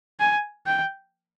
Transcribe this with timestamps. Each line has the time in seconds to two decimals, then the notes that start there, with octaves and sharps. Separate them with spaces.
0.20 G#5
0.66 G5